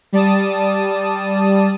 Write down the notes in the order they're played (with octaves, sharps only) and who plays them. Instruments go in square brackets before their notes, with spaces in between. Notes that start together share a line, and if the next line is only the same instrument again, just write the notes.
[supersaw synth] G3 D5 A5 D#6